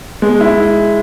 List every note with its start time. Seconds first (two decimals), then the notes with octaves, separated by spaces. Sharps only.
0.22 G#3
0.41 E4